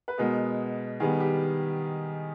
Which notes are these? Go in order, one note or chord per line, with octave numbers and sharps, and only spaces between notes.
B4
B2 G#3 B3 A#4
D#3 G3 B3 G#4
G4